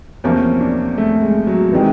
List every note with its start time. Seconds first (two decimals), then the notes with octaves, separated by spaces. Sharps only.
0.24 E2 C3 F3 A#3 C#4
0.61 D4
0.98 A3
1.22 G#3
1.47 F#3
1.72 C3 D#3 E3 G#3